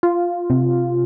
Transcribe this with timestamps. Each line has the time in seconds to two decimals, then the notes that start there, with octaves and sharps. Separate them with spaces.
0.03 F4
0.50 C3